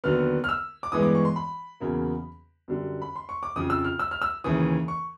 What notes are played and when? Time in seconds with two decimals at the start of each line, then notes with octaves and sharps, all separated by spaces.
0.04 D#2 D3 F#3 B3 F6
0.44 F6
0.49 E6
0.83 D6
0.92 G2 E3 G#3 B3 D#6
1.03 D6
1.15 C#6
1.25 C6
1.36 B5
1.80 E2 C#3 F#3 A#3
2.68 F#2 D3 G3
3.02 B5
3.16 C6
3.29 C#6
3.43 D6
3.56 F2 C#3 F3 D#6
3.70 E6
3.85 F6
3.99 E6
4.11 F6
4.22 E6
4.44 D#2 C#3 E3 D#6
4.88 C#6